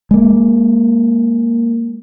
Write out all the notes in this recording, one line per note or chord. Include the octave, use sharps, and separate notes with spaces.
G#3 A#3